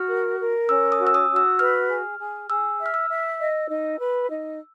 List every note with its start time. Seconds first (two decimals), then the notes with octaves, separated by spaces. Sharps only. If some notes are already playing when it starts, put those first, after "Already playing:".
Already playing: F#4 F6
0.09 A#4
0.39 A#4
0.69 C#4 E6
0.92 D#6
1.00 F#4
1.07 E6
1.14 D#6
1.30 F#4
1.36 E6
1.59 B4 F6
1.89 G#4
2.19 G#4
2.49 G#4 E6
2.80 E5
2.86 F6
2.94 E6
3.09 E5
3.40 D#5
3.69 D#4
4.00 B4
4.30 D#4